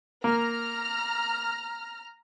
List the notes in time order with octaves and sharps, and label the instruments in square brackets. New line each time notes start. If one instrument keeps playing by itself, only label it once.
[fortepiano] A#3 [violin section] A#5 F6